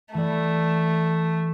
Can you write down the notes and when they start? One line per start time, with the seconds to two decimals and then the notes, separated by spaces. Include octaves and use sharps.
0.14 E3 G3 A3